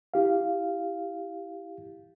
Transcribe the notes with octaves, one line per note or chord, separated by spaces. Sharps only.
E4 G4 F5